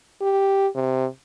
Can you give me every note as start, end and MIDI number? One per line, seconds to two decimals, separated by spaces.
0.21 0.68 67
0.75 1.06 48